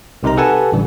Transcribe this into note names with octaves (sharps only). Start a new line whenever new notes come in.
C2 C3 D#4 A#4 A#5
G4 A4 B4 F#5 G#5 A5
A1 D3 G3